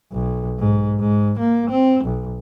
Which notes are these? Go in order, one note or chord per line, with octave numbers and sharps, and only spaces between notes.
B1
G#2
G#2
A#3
C4
B1